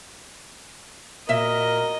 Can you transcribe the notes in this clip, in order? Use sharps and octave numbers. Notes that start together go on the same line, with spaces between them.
A#2 F#4 A#4 D#5 E5